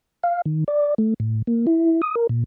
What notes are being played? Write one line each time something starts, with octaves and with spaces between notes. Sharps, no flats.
F5
D#3
D5
A3
A2
A#3
E4
D#6
A#4
A#2